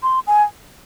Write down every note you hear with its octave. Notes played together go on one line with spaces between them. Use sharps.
C6
G#5